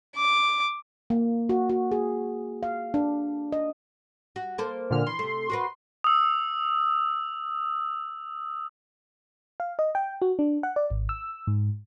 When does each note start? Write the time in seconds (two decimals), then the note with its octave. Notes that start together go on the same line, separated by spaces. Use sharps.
0.16 D6
1.10 A#3
1.49 F#4
1.69 F#4
1.91 G#4
2.63 F5
2.94 D4
3.52 D#5
4.36 F#4
4.58 A#3 A4 C5
4.90 A#2 D3 F6
5.06 E3 C6
5.19 C3 A3
5.50 F#4 A#4 B4
6.04 D#6 E6
9.60 F5
9.79 D#5
9.95 G5
10.22 F#4
10.39 D4
10.63 F#5
10.76 D5
10.90 G#1
11.09 E6
11.47 G#2